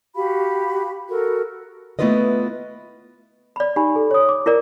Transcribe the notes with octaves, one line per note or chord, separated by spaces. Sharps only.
F#4 G4 F5 B5
F#4 A4 A#4
A3 B3 E4 F4 B4 D#5
D5 B5
D#4 G4 G#5 B5
A4
C#5 D#6
D6
E4 A#4 D5